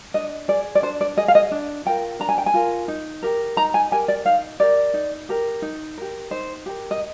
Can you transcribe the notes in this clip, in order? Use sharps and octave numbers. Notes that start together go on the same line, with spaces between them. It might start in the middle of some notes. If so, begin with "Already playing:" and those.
D4 D#5
G#4 D5
D5
D4 C5
D5
G#4 D#5
F5
D#5
D4
F4 A#4 G5
D4 A#5
G#5
G5
G#5
F4 A#4
D#4
G4 A#4
D#4 A#5
G#5
G4 A#4 G#5
D5
D#4 F5
G4 A#4 D5
D#4
G4 A#4
D#4
G4 A#4
D#4 C5
G4 A#4
D#5